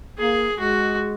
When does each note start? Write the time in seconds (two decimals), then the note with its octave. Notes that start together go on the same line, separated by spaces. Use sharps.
0.18 A#3 G#4
0.59 G#3 F#4